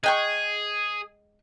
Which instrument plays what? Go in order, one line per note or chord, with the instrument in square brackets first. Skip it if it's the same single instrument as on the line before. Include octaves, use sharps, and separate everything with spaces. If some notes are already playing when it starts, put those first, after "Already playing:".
[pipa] G#3 G5 C#6 [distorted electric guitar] G#4